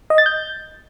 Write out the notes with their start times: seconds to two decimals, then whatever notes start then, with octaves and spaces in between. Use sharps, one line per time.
0.10 D#5
0.18 A6
0.26 G6